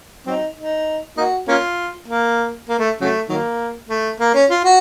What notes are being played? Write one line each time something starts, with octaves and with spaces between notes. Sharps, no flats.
F#3 C4 D#4
D#4
A#3 D#4 F#4
A#3 C#4 F4
A#3
A#3
A3
C#3 F#3 A3
D#3 F#3 A#3
A3
A#3
C#4
F4
F#4